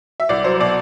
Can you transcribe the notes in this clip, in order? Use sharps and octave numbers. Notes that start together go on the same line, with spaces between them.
E5
C2 D5
F#3 C5
B2 D5